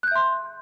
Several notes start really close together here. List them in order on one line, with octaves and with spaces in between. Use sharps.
F#6 G6 E5 C6